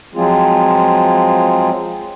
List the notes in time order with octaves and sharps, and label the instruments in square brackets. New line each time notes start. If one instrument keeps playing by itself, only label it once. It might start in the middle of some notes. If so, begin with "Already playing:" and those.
[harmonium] F3 F#3 G#3 C4 F4 G#4